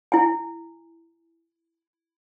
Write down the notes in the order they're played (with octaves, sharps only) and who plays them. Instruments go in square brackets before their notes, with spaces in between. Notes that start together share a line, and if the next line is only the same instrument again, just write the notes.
[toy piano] E4 G#5